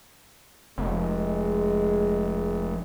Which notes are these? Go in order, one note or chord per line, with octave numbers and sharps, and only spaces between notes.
F1 G#3